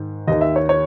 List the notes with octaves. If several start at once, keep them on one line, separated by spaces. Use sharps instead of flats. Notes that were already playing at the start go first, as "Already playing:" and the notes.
Already playing: G#2 D#3
D#2 D#3 D#5
E5
C#5
C#5